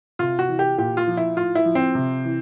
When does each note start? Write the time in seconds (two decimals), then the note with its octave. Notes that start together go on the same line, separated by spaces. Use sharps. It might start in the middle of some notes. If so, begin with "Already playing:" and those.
0.19 C3 F4
0.39 F#4
0.49 E3
0.59 G4
0.78 A#2 G4
0.97 F4
1.07 F3
1.17 E4
1.37 A2 F4
1.55 E4
1.65 F3
1.75 C4
1.95 C3
2.25 E3